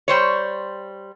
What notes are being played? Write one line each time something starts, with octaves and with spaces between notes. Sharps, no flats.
G3 C5 C#5